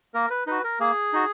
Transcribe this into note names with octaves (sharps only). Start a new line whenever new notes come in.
A#3 A#4
B4
D#4 F#4 B4
A#4
A#3 G#4
D#4 F#4